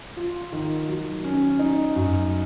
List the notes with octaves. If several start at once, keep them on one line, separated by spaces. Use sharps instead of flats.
F4
D#3
F#3
C#4
D#4
F#2